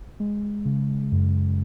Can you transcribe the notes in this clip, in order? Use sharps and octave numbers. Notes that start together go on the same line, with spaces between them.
G#3
C#3
F#2